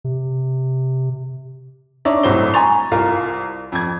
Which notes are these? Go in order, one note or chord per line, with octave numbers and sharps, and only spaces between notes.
C3
D4 D#4 C#5 D5 E5
C2 A2 F#3 C4 C5 G7
G#5 A#5 C6 C#6 A6 F7
C2 F4 A#4
F2 G#6